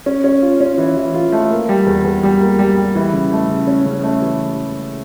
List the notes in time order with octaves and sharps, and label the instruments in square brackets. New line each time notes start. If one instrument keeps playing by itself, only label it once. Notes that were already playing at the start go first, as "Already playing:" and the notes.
[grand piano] C#4
C#4
F4
C#4
E3
E3
F4
A3
A#3
G3
E2
E2
G3
A#3
G3
G3
E3
C#3
A3
C#3
C#4
C#3
A3
E3